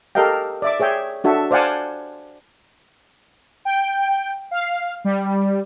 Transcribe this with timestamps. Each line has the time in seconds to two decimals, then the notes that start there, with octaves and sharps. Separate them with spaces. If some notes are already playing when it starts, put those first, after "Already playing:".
0.15 G4 A4 A#4 D#5 F5 G5
0.62 D5 E5 D6
0.80 G#4 C#5 E5 G5
1.24 D4 F#4 A4 E5
1.51 C5 D5 F5 F#5 G#5 A5
3.65 G5
4.51 F5
5.04 G3